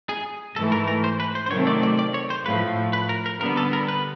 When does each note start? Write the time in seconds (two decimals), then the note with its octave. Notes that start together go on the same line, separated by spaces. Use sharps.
0.09 G#4
0.56 G#2 E3 A3 A4
0.72 A#4
0.88 A#4
1.04 C5
1.20 B4
1.35 C5
1.46 C5
1.51 C3 D#3 F#3 A3 C4 C#5
1.67 D5
1.83 D5
1.99 D5
2.14 C#5
2.30 C5
2.46 A2 F3 A3 B4
2.93 B4
3.09 A#4
3.26 A#4
3.40 D3 G3 B3 A#4
3.57 A4
3.73 A#4
3.88 B4